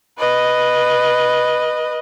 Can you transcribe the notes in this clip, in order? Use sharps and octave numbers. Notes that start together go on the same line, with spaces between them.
B4 D#5